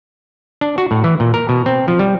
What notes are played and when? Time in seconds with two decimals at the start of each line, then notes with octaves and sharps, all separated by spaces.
0.61 D4
0.78 F#4
0.91 A2
1.04 E3
1.20 A#2
1.34 A#4
1.49 B2
1.66 C4
1.88 F3
1.99 G3